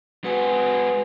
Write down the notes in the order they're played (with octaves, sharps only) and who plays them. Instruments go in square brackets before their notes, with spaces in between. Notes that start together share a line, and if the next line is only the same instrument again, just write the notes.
[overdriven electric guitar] G#3 F#4 [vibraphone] B4 G#5